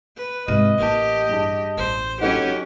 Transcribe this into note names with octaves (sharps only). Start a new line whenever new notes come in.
B4
G#2 C3 G#3 D#5 F6 D#7
A1 A#3 G4 A5
G2 G#4 A5
A1 C5
F#3 C#4 D#4 G4 A4 B4 F#5